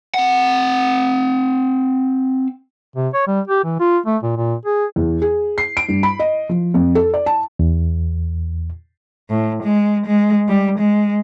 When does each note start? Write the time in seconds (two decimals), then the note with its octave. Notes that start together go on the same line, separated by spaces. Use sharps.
0.14 C4 F#5
2.96 C3
3.13 C#5
3.27 G3
3.47 G4
3.64 E3
3.80 F4
4.06 A3
4.23 A#2
4.37 A#2
4.65 G#4
4.96 E2
5.22 G#4
5.58 C7
5.77 D7
5.89 G2
6.03 B5
6.19 D#5
6.49 F3
6.74 F2
6.95 A4
7.14 D5
7.26 A5
7.59 E2
9.30 A2
9.63 G#3
10.06 G#3
10.48 G3
10.79 G#3